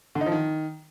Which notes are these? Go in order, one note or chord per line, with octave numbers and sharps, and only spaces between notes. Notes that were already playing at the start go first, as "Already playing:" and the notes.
D3
D#4
F3
D#3